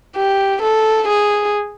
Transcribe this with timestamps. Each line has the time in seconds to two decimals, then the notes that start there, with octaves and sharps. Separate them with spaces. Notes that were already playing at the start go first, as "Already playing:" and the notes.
0.16 G4
0.62 A4
1.08 G#4